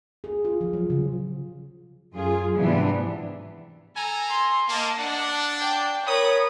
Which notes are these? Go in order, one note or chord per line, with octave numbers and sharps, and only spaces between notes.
G#4
F4
F3
F#3
C#3
F#2 F4 G#4
G#2 C3 E3 B3 D4
A4 G#5 A#5
C6
A#3 D#5 A5
D4 F#5
G5
A#4 C#5 B5 D#6